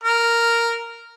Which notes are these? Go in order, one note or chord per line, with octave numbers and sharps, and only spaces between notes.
A#4